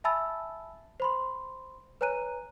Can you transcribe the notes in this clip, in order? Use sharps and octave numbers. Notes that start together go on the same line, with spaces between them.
E5 G#5 A5 B5 E6 A6
C5 B5 C6
B4 C#5 G#5 A#5 F#6 D#7